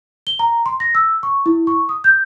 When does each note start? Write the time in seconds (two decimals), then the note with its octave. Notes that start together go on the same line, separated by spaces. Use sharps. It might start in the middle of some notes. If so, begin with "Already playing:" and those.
0.27 G7
0.39 A#5
0.66 C6
0.80 A#6
0.95 E6
1.23 C#6
1.46 E4
1.67 C#6
1.89 D#6
2.04 G6